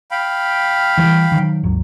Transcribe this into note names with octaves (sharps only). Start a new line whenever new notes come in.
F5 G5 B5
E3 G3
D#3 F#3
G#1 D#2 F#3